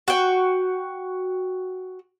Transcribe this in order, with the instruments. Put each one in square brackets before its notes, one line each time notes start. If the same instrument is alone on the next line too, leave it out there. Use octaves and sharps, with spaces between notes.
[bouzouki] F#4 G5